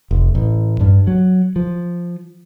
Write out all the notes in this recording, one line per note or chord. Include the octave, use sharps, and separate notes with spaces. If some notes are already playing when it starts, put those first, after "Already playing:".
F1
A1
G2
F#3
F3